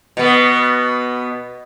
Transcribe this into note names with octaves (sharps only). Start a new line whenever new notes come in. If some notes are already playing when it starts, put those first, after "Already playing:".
B2 B3